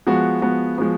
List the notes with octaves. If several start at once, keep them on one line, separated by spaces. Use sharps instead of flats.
F3 G#3 B3 F#4
F3 G#3 B3 F#4
F3 G#3 B3 F#4